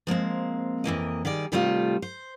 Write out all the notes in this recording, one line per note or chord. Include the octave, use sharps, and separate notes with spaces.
F3 G#3 A#3 C4
F2 E3 A#3 D#5
D#3 G3 G#4 D5
C3 D#3 G3 A3 B3 F4
C5